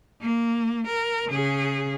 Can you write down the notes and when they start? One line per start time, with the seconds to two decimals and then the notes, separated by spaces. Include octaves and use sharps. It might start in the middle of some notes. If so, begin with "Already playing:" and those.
0.22 A#3
0.87 A#4
1.29 C#3 G#4